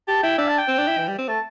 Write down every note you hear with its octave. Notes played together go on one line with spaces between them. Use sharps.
G4 A5
E4 G5
D4 E5
A5
G5
C4
D4
E4
E3
G3
C4
A3 A5